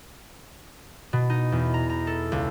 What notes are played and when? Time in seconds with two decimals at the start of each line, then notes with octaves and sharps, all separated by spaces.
1.13 B2
1.30 D#4
1.52 E2
1.74 A#5
1.90 A#5
2.07 A4
2.32 C#2